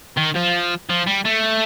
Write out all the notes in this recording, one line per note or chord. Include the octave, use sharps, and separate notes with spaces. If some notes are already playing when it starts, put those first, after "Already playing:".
D#3
F3
F3
G3
A3